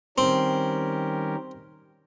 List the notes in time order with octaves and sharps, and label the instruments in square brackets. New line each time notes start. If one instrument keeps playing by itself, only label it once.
[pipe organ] D#3 G3 C#4 G4 A#4 [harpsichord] C4